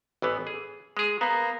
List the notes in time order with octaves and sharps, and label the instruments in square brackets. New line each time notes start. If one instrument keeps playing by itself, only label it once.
[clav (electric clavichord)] A1 E3 B3
G#4
G#3 G#4
[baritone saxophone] A#3 [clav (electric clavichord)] B3